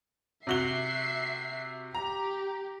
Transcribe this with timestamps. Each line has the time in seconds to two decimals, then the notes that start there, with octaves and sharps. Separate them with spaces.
0.47 C3 F#4 E5 C7 G7
1.95 G4 A#5